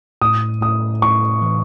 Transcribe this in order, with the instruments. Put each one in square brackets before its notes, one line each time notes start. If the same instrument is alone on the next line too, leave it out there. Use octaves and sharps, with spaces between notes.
[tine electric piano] A2 [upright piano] D#6
[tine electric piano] A2 [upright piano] D#6
[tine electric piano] A2 [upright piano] C#6
[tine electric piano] E3